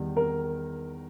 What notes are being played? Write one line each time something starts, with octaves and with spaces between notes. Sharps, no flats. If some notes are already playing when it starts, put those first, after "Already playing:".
Already playing: E2 D#3 G3
A#4